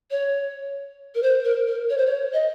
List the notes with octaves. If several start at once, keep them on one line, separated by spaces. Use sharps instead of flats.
C#5
A#4
C5
A#4
A#4
C#5
C5
C#5
D#5